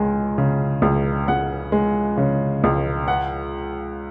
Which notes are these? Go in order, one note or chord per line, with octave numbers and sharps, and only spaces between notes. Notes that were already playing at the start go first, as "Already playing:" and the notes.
Already playing: C#2 G#3
C#3
C#2
C#2 F#5
G#3
C#3
C#2
F#5